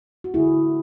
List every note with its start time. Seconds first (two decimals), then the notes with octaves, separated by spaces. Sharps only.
0.24 F#4
0.34 D3 A3 E4 G#4